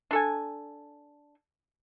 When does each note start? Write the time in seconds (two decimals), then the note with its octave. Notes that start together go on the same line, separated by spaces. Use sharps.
0.11 D4 A4 G#5